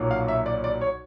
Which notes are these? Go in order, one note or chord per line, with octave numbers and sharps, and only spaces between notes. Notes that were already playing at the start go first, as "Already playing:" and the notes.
Already playing: B1 A#2 F#3
F5
E5
D5
D5
C#5